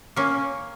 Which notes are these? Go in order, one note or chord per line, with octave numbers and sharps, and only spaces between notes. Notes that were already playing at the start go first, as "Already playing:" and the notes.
A#3 C#4